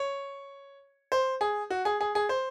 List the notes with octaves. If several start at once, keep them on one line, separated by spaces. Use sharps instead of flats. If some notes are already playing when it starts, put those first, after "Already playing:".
Already playing: C#5
C5
G#4
F#4
G#4
G#4
G#4
C5